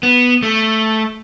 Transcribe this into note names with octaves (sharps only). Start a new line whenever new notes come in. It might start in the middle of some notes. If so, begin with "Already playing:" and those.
B3
A3